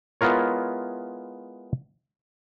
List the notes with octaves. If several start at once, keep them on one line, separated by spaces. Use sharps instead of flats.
G#3 B3 E4 F4 A#4 C#5